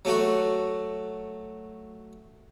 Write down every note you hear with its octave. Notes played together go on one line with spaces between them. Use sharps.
F#3 A3 F#4